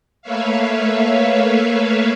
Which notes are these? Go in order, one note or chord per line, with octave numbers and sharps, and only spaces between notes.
A3 A#3 B4 C#5 E5 F5